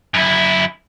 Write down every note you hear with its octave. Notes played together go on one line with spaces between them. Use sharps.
F#2 E4